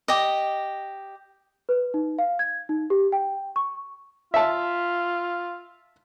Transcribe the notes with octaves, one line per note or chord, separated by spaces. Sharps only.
G4 D#5
B4
D#4
F5
G#6
D#4
G4
G5
C#6
F4 E5 A5